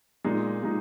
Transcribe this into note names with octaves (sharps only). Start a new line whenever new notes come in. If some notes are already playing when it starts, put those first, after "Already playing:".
A#2 G#3 D#4
A#2 G#3 D#4